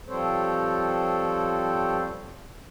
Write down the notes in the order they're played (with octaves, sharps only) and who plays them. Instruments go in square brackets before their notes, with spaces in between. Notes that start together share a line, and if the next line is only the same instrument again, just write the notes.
[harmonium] F3 G3 C4 A4 C5 C#5